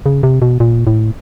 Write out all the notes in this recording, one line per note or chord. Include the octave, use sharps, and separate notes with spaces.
C#3
C3
B2
A#2
A2